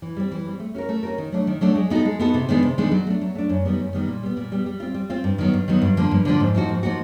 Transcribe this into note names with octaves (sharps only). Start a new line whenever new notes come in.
E3
G3 C4
E3
G3 C4
A3
C#4 F#4 A#4
A3
C#4 F#4 A#4
D#3
F#3 A3 D4
D#3
F#3 A3 D4
G#3
B3 D#4 F#4 A4
G#3
B3 D#4 F#4 A4
C3
D#3 G#3 B3 D4
C3
D#3 G#3 B3 D4
F#3
A3 D4
F#3
A3 D4
F#2
D#3 G3 B3
F#2
D#3 G3 B3
A#2
G3 B3
A#2
G3 B3
G3
C4 F4
G3
C4 F4
G2
D#3 F#3 B3
G2
D#3 F#3 B3
G2
D3 F3 A#3
G2
D3 F3 A#3
G#2
F3 A#3 D#4 F#4
G#2
F3 A#3 D#4 F#4